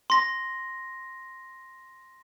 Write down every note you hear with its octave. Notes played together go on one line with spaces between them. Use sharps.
C6 A#6